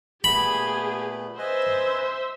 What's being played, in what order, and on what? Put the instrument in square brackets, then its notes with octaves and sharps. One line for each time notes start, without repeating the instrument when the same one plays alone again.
[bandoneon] A#2 A3 B3 [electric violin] G4 G#4 [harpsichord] B5
[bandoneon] B4 D#5 G#5 [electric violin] C5 E5